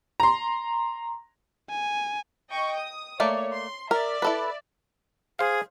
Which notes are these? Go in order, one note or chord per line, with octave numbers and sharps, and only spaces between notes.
A#5 C6
G#5
D#5 G5 C#6
D#6
A3 A#3 C#5 D5
C6
A#4 D5 E5
E4 A4 B4
G#4 C5 F5